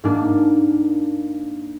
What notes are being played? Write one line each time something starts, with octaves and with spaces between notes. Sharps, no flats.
G#2 A#3 D4